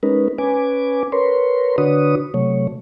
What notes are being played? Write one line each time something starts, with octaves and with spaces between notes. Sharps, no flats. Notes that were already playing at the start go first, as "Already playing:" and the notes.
G#3 C#4 D#4 A#4 B4
C#4 B4 G#5 D6
A#4 B4 C#5 C6
D3 D4 F#4 B4 C#5 D#6
C3 F#3 A3 C#5